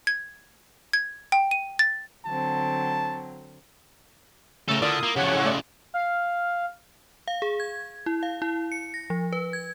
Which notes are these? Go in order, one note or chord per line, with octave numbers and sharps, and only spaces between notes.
G#6
G#6
G5
D#7
A6
D3 F#3 C4 A5
A2 C#3 A3 A4 A#4 D#7
D3 E4 F4 A#4 D5 D#6
A#3
A2 C#3 F3 B3 G4 C#5 F#5
G#2 G#3
A3 D5
F5
F5
G#4
G#6
E4
F5
E4
C#7
A#6
F3
B4
G#6